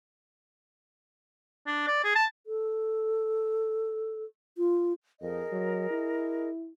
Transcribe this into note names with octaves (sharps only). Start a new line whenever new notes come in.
D4
D5
G#4
A5
A4
F4
F2 G#4 A#4 D#5
F#3
E4